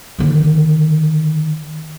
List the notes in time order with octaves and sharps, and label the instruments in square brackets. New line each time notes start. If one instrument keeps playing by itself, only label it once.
[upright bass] D3 D#3